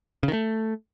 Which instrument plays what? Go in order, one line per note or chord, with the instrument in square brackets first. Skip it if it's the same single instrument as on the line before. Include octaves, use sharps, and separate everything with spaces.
[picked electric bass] C#3
D#3
A3